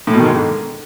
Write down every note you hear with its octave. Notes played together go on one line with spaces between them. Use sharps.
A2
B2
D#3
G#2
D3